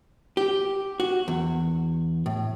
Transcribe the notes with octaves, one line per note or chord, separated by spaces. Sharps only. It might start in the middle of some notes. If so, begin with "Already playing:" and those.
G4
F#4
E2
A2